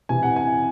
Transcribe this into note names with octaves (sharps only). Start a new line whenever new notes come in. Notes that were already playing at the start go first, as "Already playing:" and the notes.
C3 E3 G#5
F#5
G#5